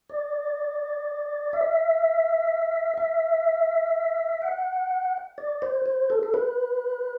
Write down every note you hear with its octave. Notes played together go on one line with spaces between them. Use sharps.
D5
E5
E5
F#5
D5
C5
C5
A4
A4
B4